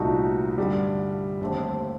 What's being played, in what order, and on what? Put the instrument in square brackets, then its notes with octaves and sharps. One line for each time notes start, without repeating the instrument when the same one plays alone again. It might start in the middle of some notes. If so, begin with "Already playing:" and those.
Already playing: [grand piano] C2 A#2 A3 D#4 F#4
G2 D3 G3
D#2 D3 A3 C4